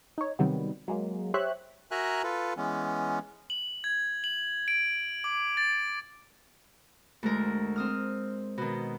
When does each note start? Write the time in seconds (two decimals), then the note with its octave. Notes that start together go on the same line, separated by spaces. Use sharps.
0.18 D#4 C#5
0.39 C3 D#3 F#3 G3 B3
0.88 F#3 G#3 A#3
1.34 G4 C5 C#5 E5 F#6
1.91 F#4 A#4 E5 G#5 A#5 F#6
2.24 F4 A4 B4
2.57 E3 G#3 B3 C#4
3.50 F#7
3.84 G#6
4.24 F#7
4.68 D7
5.24 D6
5.57 A6
7.23 D2 G#3 A#4
7.76 C4 D#6 F6
8.58 B2 D#3